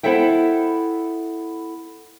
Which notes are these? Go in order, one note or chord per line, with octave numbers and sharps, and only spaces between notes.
B3 E4 A4 C5 E5 G5